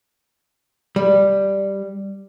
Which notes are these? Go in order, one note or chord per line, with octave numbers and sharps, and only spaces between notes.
G3